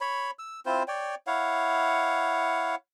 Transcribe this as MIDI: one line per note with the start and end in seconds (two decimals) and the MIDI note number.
0.01 0.31 73
0.01 0.31 83
0.39 0.60 88
0.66 0.83 60
0.66 0.83 64
0.66 0.83 65
0.66 0.83 72
0.88 1.15 73
0.88 1.15 74
0.88 1.15 79
1.27 2.75 64
1.27 2.75 73
1.27 2.75 77
1.27 2.75 78